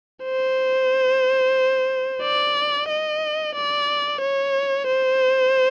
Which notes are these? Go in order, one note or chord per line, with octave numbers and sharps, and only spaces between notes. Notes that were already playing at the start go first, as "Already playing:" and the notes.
C5
D5
D#5
D5
C#5
C5